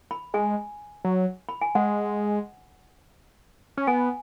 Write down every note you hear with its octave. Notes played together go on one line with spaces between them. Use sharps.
B5
G#3 G#5
F#3
B5
G#5
G#3 F#5
C#4
B3 G#5